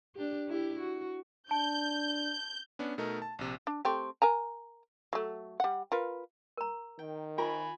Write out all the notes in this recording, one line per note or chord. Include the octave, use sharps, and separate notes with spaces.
D4 G4
E4 G4
F#4
D4 A5 G6
B3 C#4 D4
B2 A3 D#4 A#4
A5
A#1 C3
D4
A3 C4 G4
A#4 G#5 A#5
F#3 A3
G3 F#5
F4 A#4 B4
A#4 A#5
D#3 G5
F4 A#4 C5 G#5 B5 C#6